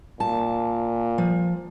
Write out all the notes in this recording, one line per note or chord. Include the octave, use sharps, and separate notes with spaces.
A#2 A5
F3